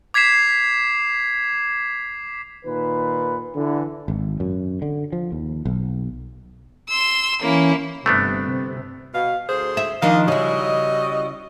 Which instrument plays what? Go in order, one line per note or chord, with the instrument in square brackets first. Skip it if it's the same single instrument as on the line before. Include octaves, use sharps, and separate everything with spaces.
[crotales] D6 G#6 B6 C7 E7
[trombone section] A#2 D#3 B4
D3 E3
[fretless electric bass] G#1
F#2
D3
F3
D#2
B1
[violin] C6 E6
[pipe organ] E3 C#4 [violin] A#3 E4
[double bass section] G1 C3 [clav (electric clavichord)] A3 B3 D4
[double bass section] C3
[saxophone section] B2 F5
D2 G#4 C5
[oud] E5
[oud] D#3 F3 D4 [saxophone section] D#5 F5
[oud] C#3 E4 [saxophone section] G3 F#4 D#5